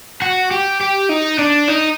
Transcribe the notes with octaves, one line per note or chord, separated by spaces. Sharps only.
F#4
G4
G4
D#4
D4
D#4